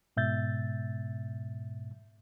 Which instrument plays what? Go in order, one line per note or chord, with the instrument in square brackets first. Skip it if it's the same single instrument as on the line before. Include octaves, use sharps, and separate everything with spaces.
[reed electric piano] G#2 B2 E5 G6 A6